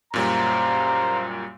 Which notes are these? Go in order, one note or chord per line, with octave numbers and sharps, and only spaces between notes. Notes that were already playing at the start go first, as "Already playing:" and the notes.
F#2 A#2 G3 C5 F5 A#5